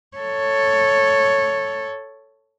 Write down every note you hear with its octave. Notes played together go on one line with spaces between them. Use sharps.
A4 C#5